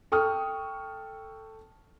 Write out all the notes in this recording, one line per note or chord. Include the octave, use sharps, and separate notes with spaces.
A4 G5 C#6 D#6 F6